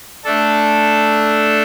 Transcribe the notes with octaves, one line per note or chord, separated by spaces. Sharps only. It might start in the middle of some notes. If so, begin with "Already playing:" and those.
A3 D4 A4